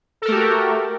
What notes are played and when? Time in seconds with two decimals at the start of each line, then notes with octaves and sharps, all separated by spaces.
0.22 A4
0.25 A#4
0.28 A3
0.32 G4
0.35 F#4